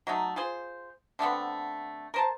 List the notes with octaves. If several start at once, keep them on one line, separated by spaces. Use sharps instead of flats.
F#3 A3 D#4
F4 G#4 C5
D3 A3 B3 C4
A#4 C5 A5